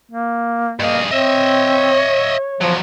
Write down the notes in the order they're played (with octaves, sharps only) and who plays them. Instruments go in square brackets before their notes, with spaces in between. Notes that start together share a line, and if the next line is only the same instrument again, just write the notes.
[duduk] A#3
[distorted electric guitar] G2 G#4 [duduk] A#3 [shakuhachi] D#5
[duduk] C4 [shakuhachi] C#5 [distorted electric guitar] D#5 E5
[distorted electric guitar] E2 F#3 [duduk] F3